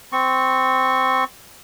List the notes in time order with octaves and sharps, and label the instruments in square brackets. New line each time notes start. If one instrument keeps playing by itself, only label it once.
[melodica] C4 C#6